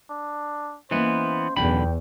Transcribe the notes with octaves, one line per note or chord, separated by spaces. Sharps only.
D4
E3 A#3 B3 C#4 C5 D#5
B1 E2 D3 G5 B5